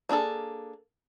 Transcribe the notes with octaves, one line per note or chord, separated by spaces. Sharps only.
A#3 D4 G#4 A4